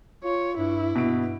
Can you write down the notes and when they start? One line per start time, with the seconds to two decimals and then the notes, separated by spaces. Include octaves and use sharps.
0.24 F4 C#5
0.58 G2 E4
0.95 G2 B2 D7